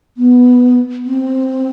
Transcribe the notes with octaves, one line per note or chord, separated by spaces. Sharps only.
B3
C4